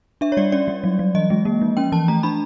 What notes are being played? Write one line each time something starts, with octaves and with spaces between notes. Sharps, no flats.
D4 E5
C#5
G3 D5
C#4 D5
G3
F#3
F#3
E3 D#5
G#3
A#3
F3
C#4 G5
E3 A5
A3 A#5
D4 B5